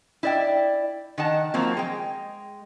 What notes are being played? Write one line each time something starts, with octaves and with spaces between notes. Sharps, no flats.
E4 D5 G5
D#3 F#5 A5
F3 F#3 A#3 C4
G#3 G5